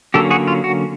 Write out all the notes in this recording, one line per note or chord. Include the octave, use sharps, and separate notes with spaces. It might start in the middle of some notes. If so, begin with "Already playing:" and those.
D3 F#3 A#3 C#4 G4 A4
F#4 G#4
F4
F#4